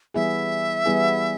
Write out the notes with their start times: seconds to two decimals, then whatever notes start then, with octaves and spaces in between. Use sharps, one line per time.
0.14 E3 G3 B3 E4 G#4 E5
0.86 E3 G3 B3 E4 G#4